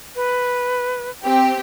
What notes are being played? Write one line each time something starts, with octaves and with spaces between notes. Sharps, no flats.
B4
C4 G4 G5